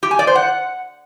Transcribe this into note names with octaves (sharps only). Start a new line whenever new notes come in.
G4
G#5
D5
C5
F#5